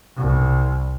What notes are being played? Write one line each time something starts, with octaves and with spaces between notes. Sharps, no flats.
C2